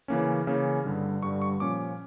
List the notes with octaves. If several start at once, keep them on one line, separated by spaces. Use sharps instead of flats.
C#3 E3 A#3 C#4
C#3 E3 A#3 C#4
G2 D3 G3
G2 D3 G3 C#6
C#6
A#2 F3 C#4 D6